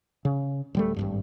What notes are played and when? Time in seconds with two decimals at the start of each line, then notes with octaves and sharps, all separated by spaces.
0.25 C#3
0.75 D1 G3 A3
0.96 G#1 E2 G2